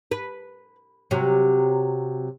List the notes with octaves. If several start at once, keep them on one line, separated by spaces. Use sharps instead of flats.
B4
C3 F#3